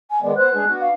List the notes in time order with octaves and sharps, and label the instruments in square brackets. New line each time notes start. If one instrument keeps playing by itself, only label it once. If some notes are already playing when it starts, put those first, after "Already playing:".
[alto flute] G#5
[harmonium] D#3 G#3 B3 [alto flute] D5
[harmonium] B3 C5 [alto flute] B4 [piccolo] F#6
[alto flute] G#3 [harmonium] D4 G#4
[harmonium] B3 F#4 [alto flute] D4
[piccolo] F5